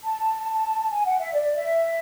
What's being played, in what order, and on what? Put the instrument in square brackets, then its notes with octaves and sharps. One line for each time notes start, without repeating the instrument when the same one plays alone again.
[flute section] A5
G#5
F#5
E5
D5
E5